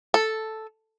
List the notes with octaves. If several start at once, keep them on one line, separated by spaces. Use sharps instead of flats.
A4